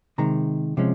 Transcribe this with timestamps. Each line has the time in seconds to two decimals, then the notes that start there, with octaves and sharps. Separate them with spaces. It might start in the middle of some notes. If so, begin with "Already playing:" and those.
0.18 C3 D#3 G#3 A#5
0.77 C3 F3 G#3 C#4